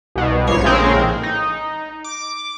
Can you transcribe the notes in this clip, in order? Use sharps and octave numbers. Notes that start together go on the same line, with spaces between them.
C2 B2
A#1 G#2 G3 C#5 C7
A#1 A2 C#3 G#3 C4 A#4
D#4
D6